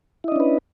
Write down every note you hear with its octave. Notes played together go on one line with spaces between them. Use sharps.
C#4 D4 E4 B4 D#5